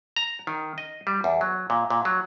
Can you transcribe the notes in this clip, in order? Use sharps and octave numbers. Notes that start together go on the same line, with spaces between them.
A#5
D#3
D#5
G3
E2
F#3
A#2
A#2
F#3